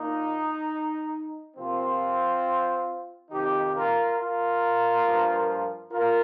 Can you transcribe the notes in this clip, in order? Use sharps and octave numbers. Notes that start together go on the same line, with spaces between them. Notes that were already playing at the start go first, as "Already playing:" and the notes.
Already playing: A#2 A#3 D#4
C3 F3 A#3 C4 F4
F2 C3 D#3 D#4 G4
F4 A#4
F4 A#4
G2 F3 A#3
F4 A#4